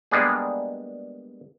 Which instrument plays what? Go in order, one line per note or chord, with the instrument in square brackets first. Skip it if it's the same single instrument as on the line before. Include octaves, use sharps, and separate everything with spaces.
[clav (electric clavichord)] G3 G#3 A#3 B3 D4 G#4